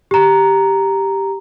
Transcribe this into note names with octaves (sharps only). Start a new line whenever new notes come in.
G4 A#5